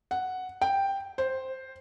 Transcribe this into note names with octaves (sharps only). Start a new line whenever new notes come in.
F#5
G5
C5